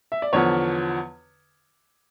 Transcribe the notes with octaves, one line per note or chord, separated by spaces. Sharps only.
E5
D5
E2 D3 F3 C#5